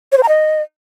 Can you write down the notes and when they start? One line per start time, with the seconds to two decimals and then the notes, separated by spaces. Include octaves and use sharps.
0.12 C#5
0.18 C5
0.23 A#5
0.29 D#5